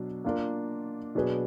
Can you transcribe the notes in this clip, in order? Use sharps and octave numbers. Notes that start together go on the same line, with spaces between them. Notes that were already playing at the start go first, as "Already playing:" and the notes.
Already playing: B2 F#3 D4
A#3 D4 F4 A#4
B2 F#3 D4 G#4 B4